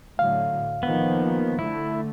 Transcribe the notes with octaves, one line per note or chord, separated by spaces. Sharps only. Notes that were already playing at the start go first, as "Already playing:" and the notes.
A2 D3 F#3 F5
D#3 F3 A#3 B3
D3 A3 E4